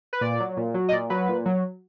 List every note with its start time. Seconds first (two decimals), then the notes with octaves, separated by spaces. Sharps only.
0.13 B4
0.21 A#2 D5
0.40 F#3
0.57 A#2
0.74 F#3
0.89 D#5
0.92 A#2 D5
1.10 F#3 B4
1.29 A#2
1.46 F#3